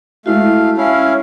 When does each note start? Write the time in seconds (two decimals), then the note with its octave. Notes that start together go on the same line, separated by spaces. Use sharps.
0.26 G#3 A3 E4 F#4 F5
0.77 C#4 E4 F5 F6